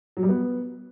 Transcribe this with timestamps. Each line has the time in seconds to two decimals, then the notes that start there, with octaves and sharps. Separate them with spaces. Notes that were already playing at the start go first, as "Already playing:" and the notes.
0.17 F#3
0.23 G3
0.29 B3